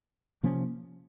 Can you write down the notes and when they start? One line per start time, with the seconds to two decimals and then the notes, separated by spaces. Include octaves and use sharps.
0.43 C3 F3 A#3 C#4